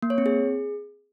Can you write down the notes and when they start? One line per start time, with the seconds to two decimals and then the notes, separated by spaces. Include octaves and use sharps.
0.02 A#3
0.10 C#5
0.18 C4
0.26 G#4